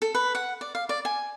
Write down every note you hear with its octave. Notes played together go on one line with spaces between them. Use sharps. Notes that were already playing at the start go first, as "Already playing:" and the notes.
A4
B4
F#5
D5
F5
D5
G#5